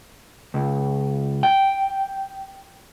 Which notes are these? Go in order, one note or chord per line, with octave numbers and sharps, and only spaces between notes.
C#2
G5